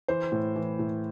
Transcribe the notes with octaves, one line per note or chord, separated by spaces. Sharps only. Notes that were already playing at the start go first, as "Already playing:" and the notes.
E3 C5
A2
E3
A2